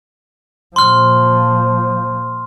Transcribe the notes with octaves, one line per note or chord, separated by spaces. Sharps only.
A#2 F3 C6 F6